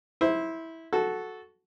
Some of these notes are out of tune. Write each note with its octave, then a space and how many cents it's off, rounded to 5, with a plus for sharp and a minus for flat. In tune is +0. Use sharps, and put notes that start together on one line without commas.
E4 -15 C5 +0
F#4 +0 A4 -10